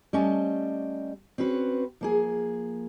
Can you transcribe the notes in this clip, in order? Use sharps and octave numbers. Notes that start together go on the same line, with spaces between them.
G3 A3 C#4 D#5 A5
C4 C#4 F#4 B4
F3 A#3 G#4